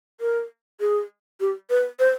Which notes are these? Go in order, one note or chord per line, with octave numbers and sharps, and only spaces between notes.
A#4
G#4
G4
B4
C5